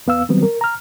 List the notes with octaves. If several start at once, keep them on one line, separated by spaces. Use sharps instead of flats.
E2 B3 F5 E6
D#3 F#3 G3 B3 C4
A#4
A#5 F6